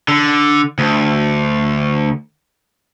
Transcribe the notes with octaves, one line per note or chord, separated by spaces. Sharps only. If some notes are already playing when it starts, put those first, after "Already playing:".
D3
D2